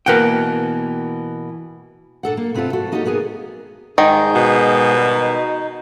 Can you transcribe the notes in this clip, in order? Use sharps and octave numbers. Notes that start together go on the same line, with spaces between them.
B2 E3 A#3 A#4 F#5 G5
A#2 D4 A4 F#5
A#3
C3 B3 C4 F4 A4
F4 F#4 A4
A#3 D#4 F#4 G4 A4 C#5
C3 A#3 B3 G#4 A#4
G#2 D#3 G#4 G6
B2
G3
D#4